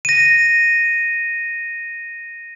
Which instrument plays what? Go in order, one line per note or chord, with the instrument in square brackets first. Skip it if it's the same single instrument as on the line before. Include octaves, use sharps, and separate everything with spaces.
[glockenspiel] A#6 D#7